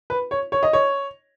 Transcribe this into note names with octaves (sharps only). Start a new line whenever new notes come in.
B4
C#5
C#5
D#5
C#5